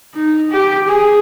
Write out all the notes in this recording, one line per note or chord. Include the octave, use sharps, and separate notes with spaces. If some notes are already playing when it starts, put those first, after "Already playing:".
D#4
G4
G#4